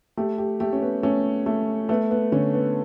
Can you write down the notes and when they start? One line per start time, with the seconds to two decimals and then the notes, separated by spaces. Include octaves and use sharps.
0.17 A3 G4
0.38 G4
0.60 A3 G4
0.73 C#4
0.82 B3
1.03 A3 C#4
1.46 A3
1.89 A3 B3
2.11 B3
2.32 D3 C#4
2.54 B3